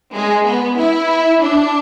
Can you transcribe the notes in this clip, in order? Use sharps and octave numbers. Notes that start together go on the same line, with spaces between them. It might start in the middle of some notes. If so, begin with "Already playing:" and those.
G#3
B3
E4
D4